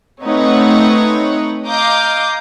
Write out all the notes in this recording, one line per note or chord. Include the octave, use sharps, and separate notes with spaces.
A3 C4 D#4 B4 C#5 F#5
D#5 F5 A#5 D6 G6